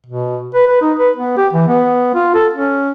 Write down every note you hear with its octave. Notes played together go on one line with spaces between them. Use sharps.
B2
B4
B4
D#4
B4
B3
G4
E3
B3
F4
A4
C#4